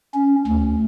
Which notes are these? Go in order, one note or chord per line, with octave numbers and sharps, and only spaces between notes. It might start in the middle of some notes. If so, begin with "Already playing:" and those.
C#4
D2